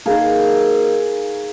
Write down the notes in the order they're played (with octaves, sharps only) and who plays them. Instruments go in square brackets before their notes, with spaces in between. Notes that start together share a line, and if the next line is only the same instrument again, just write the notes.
[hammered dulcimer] D#3 A#3 G#4